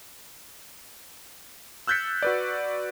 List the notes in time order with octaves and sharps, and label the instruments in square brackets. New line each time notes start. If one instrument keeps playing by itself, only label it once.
[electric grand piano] E6 F#6 G6 A6 B6 C#7
F#4 B4 D5